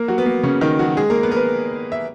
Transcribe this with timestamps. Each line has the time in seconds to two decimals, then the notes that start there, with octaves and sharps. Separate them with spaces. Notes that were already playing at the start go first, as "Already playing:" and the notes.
Already playing: A#3 A#4
0.08 F#3 F#4
0.18 B3
0.26 A#3
0.43 C#3 C#4
0.61 D#3 D#4
0.79 F#3 F#4
0.97 G#3 G#4
1.10 A#3 A#4
1.23 B3 B4
1.31 A#4
1.36 B3 B4
1.92 E5